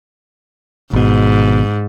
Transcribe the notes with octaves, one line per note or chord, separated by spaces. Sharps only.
G#1 G#2 B2